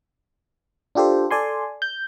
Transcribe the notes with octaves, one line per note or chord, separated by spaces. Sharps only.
D4 F4 G4 A4 C5
A4 D5 G#5 C6
G6